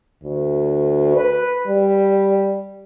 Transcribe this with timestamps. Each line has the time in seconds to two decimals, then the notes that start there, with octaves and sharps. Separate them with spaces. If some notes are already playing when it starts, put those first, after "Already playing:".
0.23 D2
1.16 B4
1.68 G3